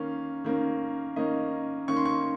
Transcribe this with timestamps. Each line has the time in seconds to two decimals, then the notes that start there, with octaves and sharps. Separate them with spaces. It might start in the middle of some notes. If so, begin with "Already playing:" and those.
Already playing: D#3 A#3 C#4 F5
0.44 D#3 A#3 C#4
1.16 D#3 A#3 C#4 D#5
1.88 D#3 A#3 C#4 C#6
1.96 C6
2.05 C#6